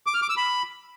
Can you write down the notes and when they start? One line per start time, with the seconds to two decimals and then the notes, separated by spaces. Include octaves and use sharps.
0.07 D6
0.14 F6
0.22 D6
0.30 E6
0.37 B5